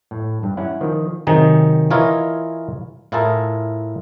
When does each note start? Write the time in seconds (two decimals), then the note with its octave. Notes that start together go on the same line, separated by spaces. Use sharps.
0.11 A2
0.43 G2
0.57 C#4 E4 F#5
0.81 D#3 F3
1.27 C3 D#3 F#3 D#4 G#4
1.90 E3 E4 F4 A#4 C#5 D#5
3.12 A2 E4 F4 G#4 A#4 A5